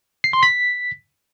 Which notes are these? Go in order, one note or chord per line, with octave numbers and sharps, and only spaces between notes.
C7
C6
B6